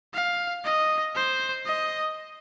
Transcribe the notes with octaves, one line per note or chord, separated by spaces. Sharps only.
F5
D#5
C5
D#5